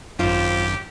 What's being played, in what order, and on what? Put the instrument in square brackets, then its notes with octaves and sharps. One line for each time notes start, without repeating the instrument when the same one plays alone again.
[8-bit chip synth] G#1 F#2 [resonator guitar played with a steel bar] F4 C5 [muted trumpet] G4